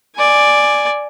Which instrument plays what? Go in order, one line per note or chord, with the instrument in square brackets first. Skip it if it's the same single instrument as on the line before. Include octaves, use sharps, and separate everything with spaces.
[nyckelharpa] D5 G#5